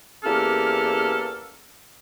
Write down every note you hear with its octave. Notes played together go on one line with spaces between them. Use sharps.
E2 A#3 C#4 G4 A4 F6